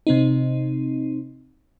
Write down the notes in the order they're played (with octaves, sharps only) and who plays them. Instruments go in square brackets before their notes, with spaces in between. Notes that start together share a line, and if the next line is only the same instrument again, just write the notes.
[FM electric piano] C3 C4 D#4